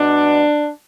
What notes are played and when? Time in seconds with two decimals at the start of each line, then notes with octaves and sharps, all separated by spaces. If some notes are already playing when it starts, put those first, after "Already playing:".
Already playing: B2 G#3 B3 D4